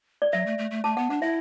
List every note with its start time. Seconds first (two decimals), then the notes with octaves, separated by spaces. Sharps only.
0.22 D5
0.33 F#3 E5
0.46 A3
0.58 A3
0.71 A3
0.84 A3 A5
0.97 B3 F#5
1.10 D4 F#5
1.22 E4 E5